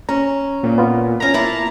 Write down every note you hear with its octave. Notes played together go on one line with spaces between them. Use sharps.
C#4 A#5
A#2
B3 F4
E3 C#4 A#5
A#3 E4 A5